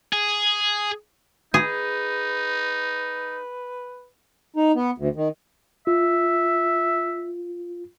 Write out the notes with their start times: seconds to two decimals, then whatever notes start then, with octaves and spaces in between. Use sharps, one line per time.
0.13 G#4
1.54 D#4 G#4 B4
4.56 D#4
4.75 B3
4.98 D2
5.16 D#3
5.87 F4 E5